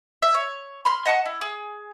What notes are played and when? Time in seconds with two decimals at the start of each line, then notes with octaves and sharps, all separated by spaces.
0.22 E5
0.34 C#5
0.85 B5 C6 F6
1.05 D#5 F#5 A5 C#6
1.25 E4
1.41 G#4